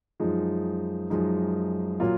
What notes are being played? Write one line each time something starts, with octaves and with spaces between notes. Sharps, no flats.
F#2 F3 G#3 D#4
F#2 F3 G#3 D#4
A#2 F#3 A#3 F4